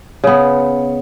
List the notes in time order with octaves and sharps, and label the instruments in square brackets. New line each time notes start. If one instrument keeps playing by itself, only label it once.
[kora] C#3 B3